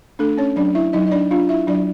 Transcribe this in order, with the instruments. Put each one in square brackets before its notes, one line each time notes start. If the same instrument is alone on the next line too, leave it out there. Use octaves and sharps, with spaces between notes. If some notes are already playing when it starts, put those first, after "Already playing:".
[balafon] A3 D4 A4
C#4 C#5
F#3 D4 D5
E4 E5
F#3 D#4 D#5
D#5
D4 D5
D4 F4 F5
E4 E5
F#3 D4 D5